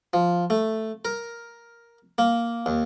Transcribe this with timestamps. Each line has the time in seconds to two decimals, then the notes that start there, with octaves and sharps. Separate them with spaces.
0.13 F3
0.50 A3
1.05 A#4
2.18 A#3
2.66 D#2